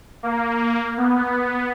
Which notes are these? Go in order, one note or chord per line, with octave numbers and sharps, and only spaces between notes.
A#3
B3